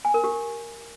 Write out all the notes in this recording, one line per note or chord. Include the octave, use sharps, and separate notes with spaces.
G#5
A#4
G4